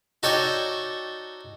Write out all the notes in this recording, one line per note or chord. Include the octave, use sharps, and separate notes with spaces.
D#4 F#4 A4 C#5 D5 G5